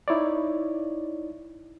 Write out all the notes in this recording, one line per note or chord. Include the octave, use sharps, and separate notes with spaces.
D#4 E4 C#5 D5